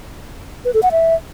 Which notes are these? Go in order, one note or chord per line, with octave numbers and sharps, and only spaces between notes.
B4
A4
F#5
E5